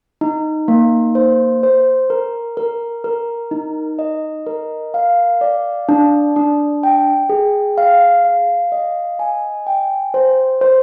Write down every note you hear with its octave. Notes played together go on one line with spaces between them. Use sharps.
D#4
A#3
C5
C5
A#4
A#4
A#4
D#4
D#5
A#4
F5
D5
D4
D4
G5
G#4
F5
F5
D#5
G#5
G5
C5
C5